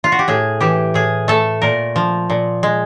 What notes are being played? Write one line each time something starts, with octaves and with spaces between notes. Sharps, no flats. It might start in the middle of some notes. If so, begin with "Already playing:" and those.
F4
F#4
G4
A2 G#4
E3 G4
A2 G#4
A3 A4
A#2 A#4
F3
A#2
G#3